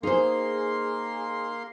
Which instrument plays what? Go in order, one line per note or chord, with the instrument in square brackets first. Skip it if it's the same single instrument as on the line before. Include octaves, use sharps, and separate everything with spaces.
[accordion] A#3 C6 [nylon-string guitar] D#4 C5 [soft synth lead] G#4